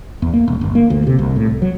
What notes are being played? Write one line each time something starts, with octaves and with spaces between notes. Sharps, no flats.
E2
A#3
E1
G1
A#3
D2
C3
C2
A2
C2
F#3